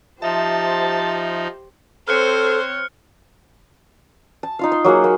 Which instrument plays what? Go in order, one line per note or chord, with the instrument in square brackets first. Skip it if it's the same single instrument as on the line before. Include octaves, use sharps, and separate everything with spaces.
[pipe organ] F3 D#4 [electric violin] G4 C5 [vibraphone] E5 [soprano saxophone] A5
[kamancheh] C4 C#5 [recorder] A4 [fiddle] C5 [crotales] F6 F#6 C#7
[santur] A5
D#4 F4 F5
C6
F#3 A#3 G#4 F#5
A#3